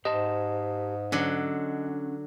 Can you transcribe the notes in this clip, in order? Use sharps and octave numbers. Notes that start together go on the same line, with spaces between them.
G#2 G4 C5 D#5 A5
D3 F#3 C#4